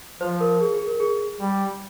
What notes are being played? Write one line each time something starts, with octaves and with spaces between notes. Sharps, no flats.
F3 C5
A#4
G#4
G#4
A#4
G#4
G3